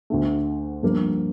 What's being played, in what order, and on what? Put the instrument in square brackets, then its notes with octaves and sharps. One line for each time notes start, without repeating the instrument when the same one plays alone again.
[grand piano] D2 D3 A3
G2 F3 A#3